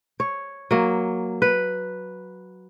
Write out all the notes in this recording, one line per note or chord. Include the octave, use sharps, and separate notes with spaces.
C#5
F#3 A#3
B4